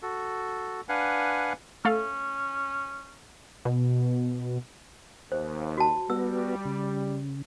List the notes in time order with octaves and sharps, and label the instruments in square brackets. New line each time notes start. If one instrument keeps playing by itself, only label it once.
[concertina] F#4 A4
D4 B4 F5 F#5 G#5
[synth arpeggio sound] A3 A4 F5 [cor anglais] C#4
[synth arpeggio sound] B2
[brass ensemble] D#2 [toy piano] C5
[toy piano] F#4 A5
[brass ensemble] G3 [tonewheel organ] B3 F#4 [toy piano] E6
[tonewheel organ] C#3